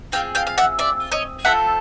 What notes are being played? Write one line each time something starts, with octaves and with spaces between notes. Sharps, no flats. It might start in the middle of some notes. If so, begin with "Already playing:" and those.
C4 F4 G#4 F5 G5
F5 G5
F5
E5 F#5
D5 E5
C#5 D#5
A3 C4 F4 A4 E5 F#5